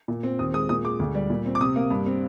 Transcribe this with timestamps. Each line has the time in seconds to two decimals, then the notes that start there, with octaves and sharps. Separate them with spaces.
0.08 A#2
0.23 C4
0.39 D#2 D#6
0.54 G#3 D#6
0.69 A#2 D#6
0.85 G#3 D6
0.99 D2
1.15 G3
1.30 A#2
1.46 C4
1.55 D6
1.61 C3 D#6
1.76 A#3
1.91 G2
2.06 C4